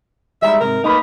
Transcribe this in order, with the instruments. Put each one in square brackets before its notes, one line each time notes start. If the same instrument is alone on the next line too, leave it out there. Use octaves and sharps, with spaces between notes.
[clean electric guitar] G3 G#3 D#4 [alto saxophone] E5
[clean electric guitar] G#2 C3 [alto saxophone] A#4
[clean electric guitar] A3 A#3 B4 [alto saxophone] D#4